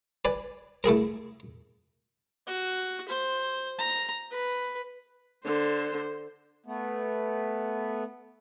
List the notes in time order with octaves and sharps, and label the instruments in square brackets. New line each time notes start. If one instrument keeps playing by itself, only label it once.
[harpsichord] B4 D5 G#5
A3 E4 G#4 A#4
[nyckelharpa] F#4
C5
A#5
B4
[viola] D3 C5
[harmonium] A3 B3